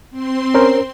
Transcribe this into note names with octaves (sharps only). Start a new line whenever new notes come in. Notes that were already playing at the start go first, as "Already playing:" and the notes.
C4 C6
C#4 A#4 C5